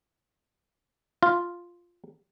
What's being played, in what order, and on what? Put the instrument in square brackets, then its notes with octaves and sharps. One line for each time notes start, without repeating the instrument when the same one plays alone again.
[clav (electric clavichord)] F4